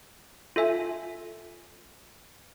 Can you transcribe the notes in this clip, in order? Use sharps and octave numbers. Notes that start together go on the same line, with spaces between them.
F4 A4 E5 G#5